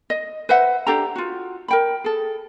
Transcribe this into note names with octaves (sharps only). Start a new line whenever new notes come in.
D#5
B4 C5 E5 F#5
D4 G4 A4 A#5
F4 F#4
A#4 G5 B5
G#4 A4